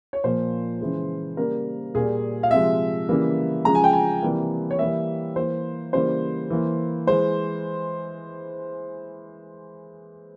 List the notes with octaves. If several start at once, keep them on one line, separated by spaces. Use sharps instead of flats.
C#5
A#2 F3 A#3 C5
C#3 E3 G#3
C#3 G3 A#3 A#4
A#2 G3 A#3 G#4
F5
C3 F3 G#3 E5
C#3 E3 G3 A#3
C#3 F3 G#3 A#5
G#5
G5
G#5
C3 E3 G3 A#3
C#5
E3 G3 A#3 E5
E3 A#3 C5
C#3 E3 G3 A#3 C5
E3 A#3
E3 G#3 C5